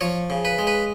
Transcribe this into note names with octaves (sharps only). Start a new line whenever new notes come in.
F3 C#5
C#3
B4
G#3
B4